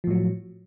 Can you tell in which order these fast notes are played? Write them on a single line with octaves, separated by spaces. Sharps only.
F3 A2 F#3